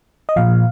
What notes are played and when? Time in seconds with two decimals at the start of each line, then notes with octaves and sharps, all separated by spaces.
0.29 D#5
0.36 A#2 F3 F5